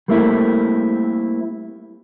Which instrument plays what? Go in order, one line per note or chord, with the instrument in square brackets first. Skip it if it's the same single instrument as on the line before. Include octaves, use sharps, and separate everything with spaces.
[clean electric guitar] G3 A3 A#3 C4 E4